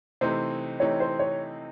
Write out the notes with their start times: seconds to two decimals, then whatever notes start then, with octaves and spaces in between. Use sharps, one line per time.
0.21 C3 E3 A3 C4 D#4 C5
0.80 C3 E3 A3 C4 D#4 C#5
1.00 C5
1.19 C#5